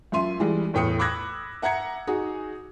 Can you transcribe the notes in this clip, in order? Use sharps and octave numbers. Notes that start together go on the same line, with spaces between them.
F#2 F4 E5 C6 D#7
E3 G3 G#3
E2 A2 G5 D#6 C#7
B5 D6 E6 F#6 G#6 A#6
E5 F#5 A#5 G#6 C#7
D#4 F#4 G#4